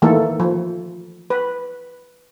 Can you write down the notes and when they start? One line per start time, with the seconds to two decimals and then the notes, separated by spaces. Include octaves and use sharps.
0.02 D#3 E3 A3 A#3 A4
0.40 F3
1.30 B4